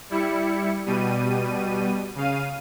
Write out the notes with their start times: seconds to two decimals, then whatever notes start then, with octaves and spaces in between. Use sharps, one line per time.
0.10 G3 E4 C#7
0.86 B2 G3 D#7
2.16 C#3 F5 D#7